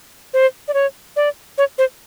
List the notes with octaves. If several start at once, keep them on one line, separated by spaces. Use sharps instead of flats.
C5
D5
C#5
D5
C#5
C5